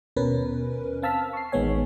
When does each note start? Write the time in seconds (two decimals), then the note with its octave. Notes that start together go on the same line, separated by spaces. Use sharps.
0.16 D#2 B2 C#4 A#4 B4
1.02 C4 F5 A5 E6 F6 B6
1.33 C#6 C7
1.52 A1 D#3 G#3 B3 C#5 G#5